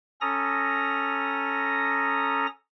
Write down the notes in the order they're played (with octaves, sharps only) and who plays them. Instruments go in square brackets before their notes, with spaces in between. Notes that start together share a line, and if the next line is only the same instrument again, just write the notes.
[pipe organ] C#4 A4 A#5 D#6 A#6